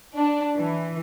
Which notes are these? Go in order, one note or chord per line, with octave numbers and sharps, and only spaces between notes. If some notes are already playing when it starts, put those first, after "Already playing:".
D4
E3